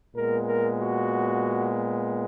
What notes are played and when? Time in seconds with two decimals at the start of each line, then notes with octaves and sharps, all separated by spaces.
0.15 A#2 G#3 B3 A#4
0.47 A#4
0.80 F#4